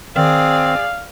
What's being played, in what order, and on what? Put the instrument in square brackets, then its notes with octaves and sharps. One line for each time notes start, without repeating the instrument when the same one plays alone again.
[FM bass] D#3 [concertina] C4 [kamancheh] G#4 D5 [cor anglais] F5